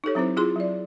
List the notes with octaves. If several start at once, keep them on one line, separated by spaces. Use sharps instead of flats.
D#4 G4 A4 C#5
F#3 C4 E4 C5
E4 F4 G#4 C6
F#3 D5